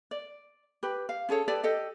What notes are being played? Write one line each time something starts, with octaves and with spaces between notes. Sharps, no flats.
D5
G4 B4
F5
C#4 G#4 A4 C#5
G4 A4 B4 D5
G4 A4 D#5